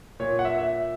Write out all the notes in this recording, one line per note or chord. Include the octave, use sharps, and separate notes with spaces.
A#2 C#5
F#5
E5
E5